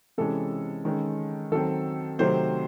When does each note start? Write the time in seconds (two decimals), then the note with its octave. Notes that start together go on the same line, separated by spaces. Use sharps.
0.18 C3 E3 G#3 C#4 A4
0.85 D#3 G#3 C#4
1.52 D#3 F#3 C4 A4
2.19 C3 D#3 F#3 A3 C4 C5